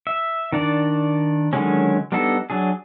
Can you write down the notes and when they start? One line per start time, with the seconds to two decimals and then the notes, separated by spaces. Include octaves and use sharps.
0.07 E5
0.52 D#3 D4 D5
1.53 D3 D#3 F#3 G#3 C#4
2.12 G3 B3 D4 D#4 A4
2.50 F#3 D4 G#4